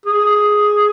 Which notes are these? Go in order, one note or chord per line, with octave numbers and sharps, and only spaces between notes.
G#4